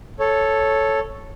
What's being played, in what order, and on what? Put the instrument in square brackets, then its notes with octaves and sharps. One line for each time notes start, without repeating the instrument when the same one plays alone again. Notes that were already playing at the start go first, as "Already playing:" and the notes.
[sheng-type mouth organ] A4 C#5